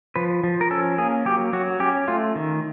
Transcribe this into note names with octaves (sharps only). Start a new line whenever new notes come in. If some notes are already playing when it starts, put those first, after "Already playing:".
F3 B4
F3
A#4
C#4 A4
A#3 G#4
F#3 G4
F#3 F#4
C#4 G4
A3 F4
D#3